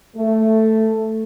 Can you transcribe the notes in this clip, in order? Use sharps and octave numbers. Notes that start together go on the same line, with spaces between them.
A3